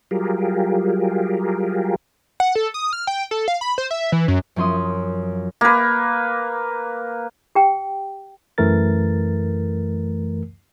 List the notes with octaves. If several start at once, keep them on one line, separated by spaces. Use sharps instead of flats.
F#3 G3 F4 G4 G#4 A#4
F#5
A4
D#6
F6
G5
A4
F5
B5
C5
E5
E3
F#2
F#2 F3 C#4 C6 D#6
A#3 B4
G4 G5
F#2 E3 A3 A#4 A6